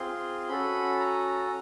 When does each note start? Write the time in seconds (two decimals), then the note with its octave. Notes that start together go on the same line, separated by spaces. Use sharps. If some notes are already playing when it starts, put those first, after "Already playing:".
Already playing: C4 F4 G#4 C6
0.49 C#4 F#4 A4 B5
1.00 A#5